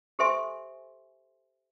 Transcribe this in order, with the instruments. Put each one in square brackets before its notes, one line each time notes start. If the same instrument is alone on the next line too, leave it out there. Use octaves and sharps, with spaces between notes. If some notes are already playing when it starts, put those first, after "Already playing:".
[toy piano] G4 A4 C5 E5 G#5 C6